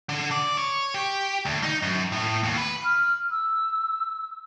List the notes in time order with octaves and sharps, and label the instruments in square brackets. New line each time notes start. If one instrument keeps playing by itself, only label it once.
[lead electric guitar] D3
D5
C#5
G4
D2
D#4
F#2
A2
D#2
B4
[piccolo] F6
E6